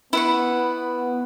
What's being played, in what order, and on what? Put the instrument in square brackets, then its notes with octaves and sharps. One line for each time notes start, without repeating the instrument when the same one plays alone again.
[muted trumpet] B3 [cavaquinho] E4 B4 C#6